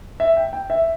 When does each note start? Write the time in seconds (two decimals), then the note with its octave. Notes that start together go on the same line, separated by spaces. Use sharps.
0.20 E5
0.37 G5
0.53 G5
0.70 E5